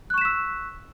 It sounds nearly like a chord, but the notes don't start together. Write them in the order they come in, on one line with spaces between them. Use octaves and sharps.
F#6 C#6 E7 B6 E6